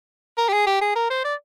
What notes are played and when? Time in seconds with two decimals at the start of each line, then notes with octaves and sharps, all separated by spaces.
0.38 A#4
0.49 G4
0.53 G#4
0.67 G4
0.81 G#4
0.96 A#4
1.10 C5
1.25 D5